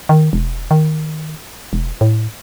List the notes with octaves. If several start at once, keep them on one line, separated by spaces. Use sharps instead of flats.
D#3
E1
D#3
E1
A2